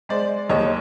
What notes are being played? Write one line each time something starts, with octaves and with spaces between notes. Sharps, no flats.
G#3 C5 D5
D#2 C#5 D#5